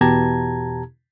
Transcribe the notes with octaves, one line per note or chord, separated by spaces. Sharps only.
E2 B2 G4 A5 A#5 G#6